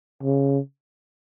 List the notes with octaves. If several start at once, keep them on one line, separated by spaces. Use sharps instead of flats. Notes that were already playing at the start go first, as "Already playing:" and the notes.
C#3